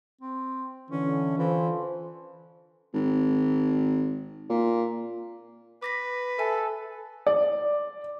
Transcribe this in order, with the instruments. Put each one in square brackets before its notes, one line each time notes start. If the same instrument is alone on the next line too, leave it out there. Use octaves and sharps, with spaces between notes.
[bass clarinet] C4
[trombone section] D3 E3 [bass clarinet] C#4
[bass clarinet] E3 [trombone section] F4 A4 C5
[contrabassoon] G#1
A#2
[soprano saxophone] B4 [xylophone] D6 A#6 B6
[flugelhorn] A4 [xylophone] E5 G#5
[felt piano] D5